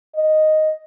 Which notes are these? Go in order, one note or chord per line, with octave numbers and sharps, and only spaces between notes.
D#5